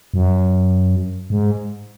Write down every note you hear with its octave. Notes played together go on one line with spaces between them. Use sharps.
F#2
G#2